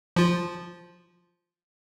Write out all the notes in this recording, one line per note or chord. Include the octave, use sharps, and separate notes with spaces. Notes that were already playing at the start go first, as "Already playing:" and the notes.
F3 F4